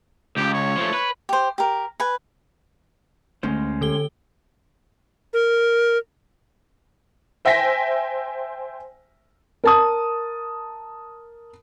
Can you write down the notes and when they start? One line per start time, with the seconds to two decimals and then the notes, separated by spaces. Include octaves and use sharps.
0.37 C#2 G4
0.54 C#5
0.77 F3 A3
0.94 B4
1.29 G4 C5
1.58 G4 A#4
2.00 B4 G#5
3.43 D2 G#3 C#4 C5
3.81 D3 A4 G7
5.33 A#4
7.45 C5 E5 G5 G#5 A#6 B6
9.64 A#4 A5 D#6